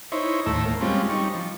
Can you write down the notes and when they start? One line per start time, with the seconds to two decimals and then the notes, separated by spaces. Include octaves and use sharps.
0.12 D#4 E4 C5 C#5
0.46 D#2 A2 A3 A#5 E6
0.65 A#3
0.81 G3 G#3 C4 C#4 F4
1.10 G3 D#4 C#6
1.34 F3